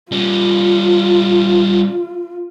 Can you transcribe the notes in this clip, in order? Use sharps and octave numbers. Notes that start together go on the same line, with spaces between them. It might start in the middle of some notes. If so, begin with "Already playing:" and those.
G3 C#4 F4